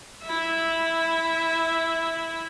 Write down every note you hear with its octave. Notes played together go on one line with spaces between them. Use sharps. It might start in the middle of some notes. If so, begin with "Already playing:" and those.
E4 E5